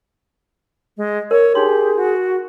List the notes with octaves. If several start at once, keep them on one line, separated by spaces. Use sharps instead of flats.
G#3
A#4 C#5
D#4 G4 G#4 C6
F#4